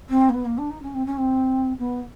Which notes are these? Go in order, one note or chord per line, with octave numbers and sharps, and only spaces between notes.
C4
A#3
B3
A#3
D4
D#4
C#4
C4
C#4
C4
B3